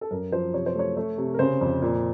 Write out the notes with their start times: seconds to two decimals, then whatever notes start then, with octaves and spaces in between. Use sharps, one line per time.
0.01 A4
0.11 F#2 A#4
0.32 F3 C5
0.53 C3 C#5
0.66 C5
0.75 A3 C#5
0.96 A3 C#5
1.18 C3
1.34 A#4
1.39 C#3 C5
1.61 F2
1.82 A#2